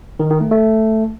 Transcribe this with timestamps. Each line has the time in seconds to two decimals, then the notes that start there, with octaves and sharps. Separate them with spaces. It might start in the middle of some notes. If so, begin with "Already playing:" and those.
0.20 D#3
0.30 D#3
0.41 A3
0.52 A3